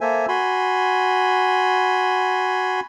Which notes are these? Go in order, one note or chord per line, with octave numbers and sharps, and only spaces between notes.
A#3 A4 C5 E5 G#5
F#4 G#5 B5 C6